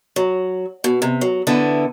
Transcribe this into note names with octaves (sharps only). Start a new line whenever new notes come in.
F#3
B2
C3
F#3
D3 B3 E4 A4